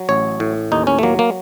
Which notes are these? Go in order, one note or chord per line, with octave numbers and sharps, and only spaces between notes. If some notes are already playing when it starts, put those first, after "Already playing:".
Already playing: F#3
A1 C#5
A2
D#2 D#4
C#4
A3
F#3 A#3
A#3